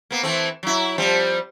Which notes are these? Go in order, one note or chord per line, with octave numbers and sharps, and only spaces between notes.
A#3 B3
E3 A3 C4
F#3 E4
F3 G3 C4